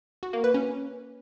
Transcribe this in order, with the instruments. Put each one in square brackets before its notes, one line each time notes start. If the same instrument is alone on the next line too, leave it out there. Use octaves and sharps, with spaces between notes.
[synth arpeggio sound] F#4
A#3
B4
C#4